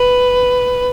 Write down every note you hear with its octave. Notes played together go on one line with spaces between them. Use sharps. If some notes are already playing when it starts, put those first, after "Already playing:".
Already playing: B4